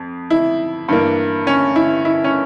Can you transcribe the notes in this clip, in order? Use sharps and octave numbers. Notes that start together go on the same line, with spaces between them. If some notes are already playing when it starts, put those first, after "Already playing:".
Already playing: F2
E4
G2 E3 A#3
C#4
E4
E4
C#4